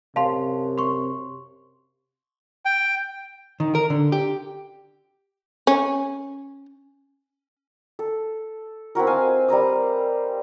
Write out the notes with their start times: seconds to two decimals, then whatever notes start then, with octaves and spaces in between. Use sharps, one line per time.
0.16 F#2 C3 F5 A5 C6
0.78 C6 C#6
2.65 G5
3.60 D#3
3.75 A#4
3.90 D3
4.12 G4
5.67 C#4
7.99 A4
8.95 C4 E4 F#4 A#4
9.07 D#5 F5 G#5 A5
9.48 G3 A#4 A#5 D#6